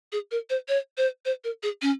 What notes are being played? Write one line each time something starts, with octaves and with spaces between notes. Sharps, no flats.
G#4
A#4
C5
C#5
C5
C5
A#4
G#4
C#4